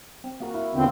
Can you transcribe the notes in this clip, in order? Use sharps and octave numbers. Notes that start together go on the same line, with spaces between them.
C4
A#3 F#4 A#4
E4
D#2 D3 E3 B3 C4 F4